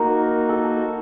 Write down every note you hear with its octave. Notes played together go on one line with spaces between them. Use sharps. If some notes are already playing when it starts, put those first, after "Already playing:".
Already playing: A#3 D#4 F#4 A#4
A4